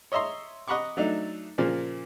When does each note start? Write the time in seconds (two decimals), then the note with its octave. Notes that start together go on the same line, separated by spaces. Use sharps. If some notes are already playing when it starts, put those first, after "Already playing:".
0.12 C#5 D#5 E5 A#5 C6
0.68 D#5 F#5 A#5 B5 C#6 D6
0.97 F#3 A3 D4 D#4
1.58 A#2 C#3 F3 A#3